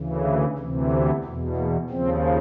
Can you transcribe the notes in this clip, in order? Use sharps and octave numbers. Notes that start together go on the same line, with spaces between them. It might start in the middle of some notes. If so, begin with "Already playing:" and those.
Already playing: D2 C#3 E3
D2 C3 E3
B3
E2 B2
A#3
D#2 C#3 F3 C4